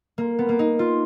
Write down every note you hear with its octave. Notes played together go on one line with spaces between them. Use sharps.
A#3
B3
A#3
D#4
F4